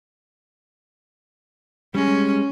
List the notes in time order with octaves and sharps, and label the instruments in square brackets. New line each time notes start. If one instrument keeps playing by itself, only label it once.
[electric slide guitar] G3 G#3 [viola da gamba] C#4